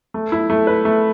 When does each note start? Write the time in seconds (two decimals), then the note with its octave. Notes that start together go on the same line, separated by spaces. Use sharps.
0.14 A3
0.32 E4
0.50 A3
0.67 B4
0.85 A3